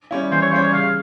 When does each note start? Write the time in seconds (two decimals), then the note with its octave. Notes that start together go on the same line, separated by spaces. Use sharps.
0.11 G3 C#4 E4
0.32 E3 C5
0.42 C#5
0.52 G3 C#4 E4 C5
0.63 C#5
0.73 C#3 F5